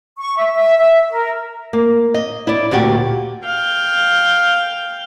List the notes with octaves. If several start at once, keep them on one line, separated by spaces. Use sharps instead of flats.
C#6
E5
E5
E5
A#4
A#3
D#5
E4 D5
D2 A#2 F#4 G4
F5 G5